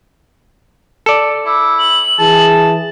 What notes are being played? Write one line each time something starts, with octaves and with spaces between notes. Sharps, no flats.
A4 D5
E4 D6
F#7
E3 G#4 A5